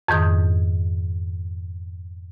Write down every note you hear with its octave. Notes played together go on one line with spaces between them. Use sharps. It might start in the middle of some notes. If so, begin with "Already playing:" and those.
F2 G#2 D#3 D#6